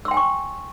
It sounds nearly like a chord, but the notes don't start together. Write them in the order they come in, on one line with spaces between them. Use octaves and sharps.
E6 C6 G5 G#5 C#6